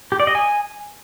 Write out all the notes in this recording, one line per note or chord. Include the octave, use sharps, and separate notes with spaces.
G4
D5
D#5
G#5